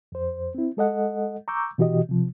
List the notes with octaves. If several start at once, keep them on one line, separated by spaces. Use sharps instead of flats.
F2 C5
C4 E4
G#3 A4 D#5 F#5
A#5 C#6 D6 E6 G6
B2 E3 F#4 G4 D#5
C3 F3